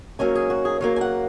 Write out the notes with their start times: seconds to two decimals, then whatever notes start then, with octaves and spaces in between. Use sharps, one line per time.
0.19 G#2 F#3 A#3 C#4 G#5
0.35 G#4
0.50 F#4
0.65 G#4
0.81 C#3 F#3 A#3 C#5
0.96 G#5
1.01 F#5